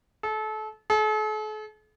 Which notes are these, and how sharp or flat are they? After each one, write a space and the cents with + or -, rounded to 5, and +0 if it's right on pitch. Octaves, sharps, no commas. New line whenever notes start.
A4 -30
A4 -45